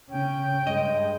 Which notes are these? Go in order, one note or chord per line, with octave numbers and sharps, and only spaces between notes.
C#3 C#4 G5
G2 G#3 D#5